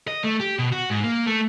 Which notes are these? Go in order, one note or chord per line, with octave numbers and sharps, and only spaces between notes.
D#5
A3
G4
B2
F#4
G#2
A#3
A3